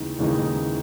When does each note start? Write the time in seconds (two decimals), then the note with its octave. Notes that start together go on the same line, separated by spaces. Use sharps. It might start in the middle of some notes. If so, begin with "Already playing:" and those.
Already playing: D#2 C#3 E3 G#3 D#4
0.19 D#2 C#3 E3 G#3 D#4